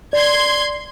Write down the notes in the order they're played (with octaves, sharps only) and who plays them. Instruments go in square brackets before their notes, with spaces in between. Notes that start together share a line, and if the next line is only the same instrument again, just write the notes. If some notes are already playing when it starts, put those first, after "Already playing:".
[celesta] D5 [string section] C6 G#6